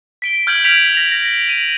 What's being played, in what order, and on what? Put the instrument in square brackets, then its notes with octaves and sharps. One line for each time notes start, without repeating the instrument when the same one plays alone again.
[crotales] B6 D7 G7
F6 G6 G#6 D7 F#7
B6 D7 F7
A#6 F7
A#6
D#7 F#7